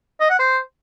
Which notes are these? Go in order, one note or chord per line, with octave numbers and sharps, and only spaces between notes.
D#5
F#5
C5